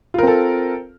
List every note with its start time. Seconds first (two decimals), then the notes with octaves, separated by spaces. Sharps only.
0.14 F4
0.18 A#4
0.23 C4
0.27 A4